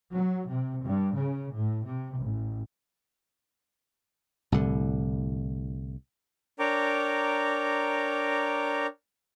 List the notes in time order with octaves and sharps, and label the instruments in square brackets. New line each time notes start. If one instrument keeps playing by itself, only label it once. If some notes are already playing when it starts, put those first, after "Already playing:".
[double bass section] F#3
C3
G2
C#3
A2
C3
A1
[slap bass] C2 A2 D3
[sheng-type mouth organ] D4 A#4 C#5 G5 A#5 D6